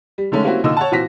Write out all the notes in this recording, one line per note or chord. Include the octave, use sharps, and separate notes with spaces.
G3
D3 D#3 G#3 A3 C#4
G3 A#3 C4 C#4 E4 F#4
A#2 D3 D#3 D#5 E6
C#5 F#5 A5
A#2 E3 C4 F#4 A#6 B6